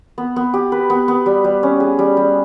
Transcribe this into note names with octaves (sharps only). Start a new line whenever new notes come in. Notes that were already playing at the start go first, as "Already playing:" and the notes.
B3
B3
G4
B4
B3
B3
G3
G3
C#4
G#4
G3
G3